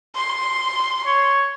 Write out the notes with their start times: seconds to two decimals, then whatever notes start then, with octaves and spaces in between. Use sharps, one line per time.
0.15 C6
1.06 C#5